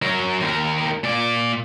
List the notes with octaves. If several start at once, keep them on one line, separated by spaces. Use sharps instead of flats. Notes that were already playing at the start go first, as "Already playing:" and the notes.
F#3 A#4
D#2 A#4
A#2 D5